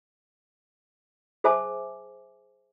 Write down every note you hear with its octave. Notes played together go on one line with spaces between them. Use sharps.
G#4 C5 E5 G#5 A5 D6